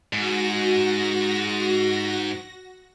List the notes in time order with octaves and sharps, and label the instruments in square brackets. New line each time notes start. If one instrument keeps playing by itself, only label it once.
[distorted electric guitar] G#2 [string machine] F#4 A#6